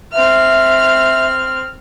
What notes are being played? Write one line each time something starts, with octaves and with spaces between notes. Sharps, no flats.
C4 E5 F6